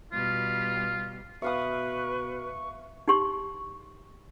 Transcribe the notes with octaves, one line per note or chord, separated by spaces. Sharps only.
B2 G3 F4
B2 B4 E5 F5 C#6 D#6
D#4 G4 C6 C#6